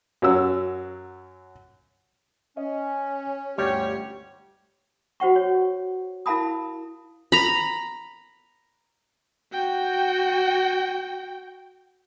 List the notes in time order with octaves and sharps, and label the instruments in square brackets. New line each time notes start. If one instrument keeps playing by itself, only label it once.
[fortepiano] F#2 F#3 E6
[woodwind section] C#4 [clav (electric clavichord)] D#5
[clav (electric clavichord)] G1 D2 G3 [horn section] G4 C#5
[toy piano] F#4 C5 F#5 C#6
C#5
E4 A#4 F5 A5 B5 D#6
[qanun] A#5 B5
[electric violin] F#4 G5